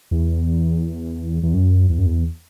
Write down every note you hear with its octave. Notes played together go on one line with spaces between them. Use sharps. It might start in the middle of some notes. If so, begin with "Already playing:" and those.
E2
E2
F#2
E2
F#2
E2